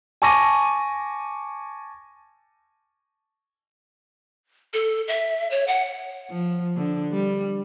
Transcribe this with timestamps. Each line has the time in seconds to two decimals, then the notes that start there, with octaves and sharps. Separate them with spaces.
0.22 G#5 A5 C#6 D6 A#6 D#7
4.73 A4
5.08 E5
5.51 C#5
5.67 F#5
6.31 F3
6.76 D3
7.12 G3